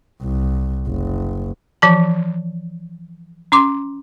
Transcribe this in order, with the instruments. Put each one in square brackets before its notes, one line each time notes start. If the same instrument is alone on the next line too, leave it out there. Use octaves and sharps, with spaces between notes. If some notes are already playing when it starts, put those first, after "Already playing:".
[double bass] C2
F#1
[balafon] E3 F3 A5
C#4 C6 D6